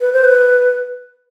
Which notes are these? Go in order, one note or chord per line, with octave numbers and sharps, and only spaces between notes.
B4
C5
B4